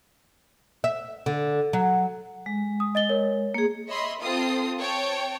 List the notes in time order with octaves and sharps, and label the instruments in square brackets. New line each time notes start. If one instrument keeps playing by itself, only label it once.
[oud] E5
D3
F#3
[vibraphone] G#3
[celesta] D#6
D#5 A6 G7
A#4 C#5
[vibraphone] A#3 G#4
[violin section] C#5 D#5 E5 B5 C6
C4 F4 A4 D#6 C7
C4 C#5 G5 A5